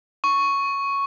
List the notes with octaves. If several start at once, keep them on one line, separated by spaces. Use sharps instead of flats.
C#6